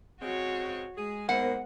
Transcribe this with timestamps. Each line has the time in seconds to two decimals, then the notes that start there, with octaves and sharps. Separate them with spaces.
0.22 C#3 G#3 C4 F#4 C#5
0.97 G#3 G#4
1.29 G#2 A#3 B3 A#4 C5 F#5